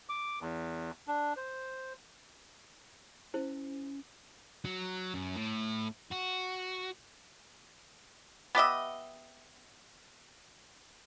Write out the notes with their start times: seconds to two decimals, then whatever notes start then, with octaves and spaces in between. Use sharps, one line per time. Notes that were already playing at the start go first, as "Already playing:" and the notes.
0.09 D6
0.41 E2
1.08 D4
1.37 C5
3.34 C#4 E4 C5
4.65 F#3
5.14 F#2
5.36 A2
6.11 F#4
8.55 B3 G4 D#5 E5